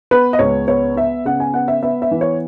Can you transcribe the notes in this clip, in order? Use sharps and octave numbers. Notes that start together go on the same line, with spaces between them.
B3 B4
D#5
C#2 C#5
B3 C#5
B3 E5
C#3 F#5
G#5
B3 F#5
E5
B3 E5
E5
E3
C#5